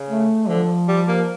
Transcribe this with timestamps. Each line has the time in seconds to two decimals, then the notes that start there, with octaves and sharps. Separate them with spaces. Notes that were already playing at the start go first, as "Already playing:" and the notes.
Already playing: C#3
0.09 A3
0.48 D3 F3
0.88 G3
1.08 A#3